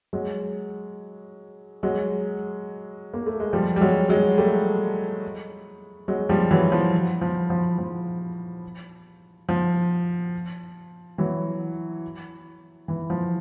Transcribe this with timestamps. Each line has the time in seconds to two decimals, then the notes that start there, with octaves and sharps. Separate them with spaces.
0.13 F#3 G#3
1.83 F#3 G#3
3.14 A#3
3.26 A3
3.40 G#3
3.53 F3 G3
3.76 G3
3.81 F#3 G#3
4.09 F#3 G#3
4.38 G3 A3
6.08 F#3 G#3
6.29 F3 G3
6.51 E3 F#3
6.72 F3
7.21 F3
7.50 F3
7.78 F3
9.49 F3
11.18 E3 F#3
12.88 E3
13.10 F3